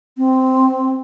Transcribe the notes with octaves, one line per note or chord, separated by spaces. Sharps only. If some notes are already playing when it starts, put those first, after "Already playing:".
C4